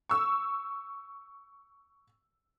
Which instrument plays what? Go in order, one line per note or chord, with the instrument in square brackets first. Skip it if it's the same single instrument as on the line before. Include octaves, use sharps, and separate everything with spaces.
[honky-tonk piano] C#6 E6